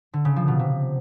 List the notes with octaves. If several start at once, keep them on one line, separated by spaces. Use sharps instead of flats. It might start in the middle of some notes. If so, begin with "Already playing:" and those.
D3
C#3
F3
B2
C3